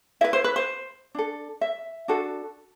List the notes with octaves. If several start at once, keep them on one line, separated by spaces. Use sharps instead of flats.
E4 B4 E5
C5
B4
C5
D4 A4
E5
D4 F#4 A4